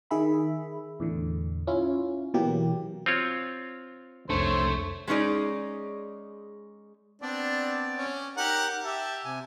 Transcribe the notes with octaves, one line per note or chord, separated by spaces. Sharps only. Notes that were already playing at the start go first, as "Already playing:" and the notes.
D#3 G#4 E5 B5
E2 A2 D3
C#4 E4 F4
B2 E3 F#3 A#3 G4
C4 F4 C#5
C2 F2 A3 D4 C5 C#5
G#3 A3 C#4 D#4 G#4 D5
B3 C4 D4 D5
C#4
D#4 G4 A#4 F#5
G4 E5 A5
C3 G#5